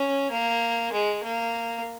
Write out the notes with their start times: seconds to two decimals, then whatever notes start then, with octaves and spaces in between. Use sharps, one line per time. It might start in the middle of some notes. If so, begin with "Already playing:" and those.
Already playing: C#4
0.31 A#3
0.92 G#3
1.23 A#3